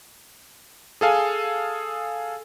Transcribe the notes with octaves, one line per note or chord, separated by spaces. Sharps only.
G#4 A4 F5 G#5